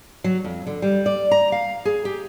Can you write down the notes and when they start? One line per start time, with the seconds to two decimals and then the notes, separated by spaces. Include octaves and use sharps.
0.24 F#3
0.44 F2
0.67 D3
0.82 G3
1.06 D5
1.31 A#5
1.52 F5
1.85 G#4
2.05 G4